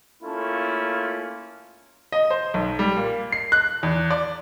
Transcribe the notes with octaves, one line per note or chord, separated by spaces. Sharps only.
A3 A#3 C#4 E4 F4 A4
D#5
C5
B1
G3
A#2
C7
F#6
E2
D5